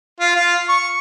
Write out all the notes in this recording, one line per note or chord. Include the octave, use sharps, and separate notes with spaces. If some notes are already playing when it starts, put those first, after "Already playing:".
F4
F4
C#6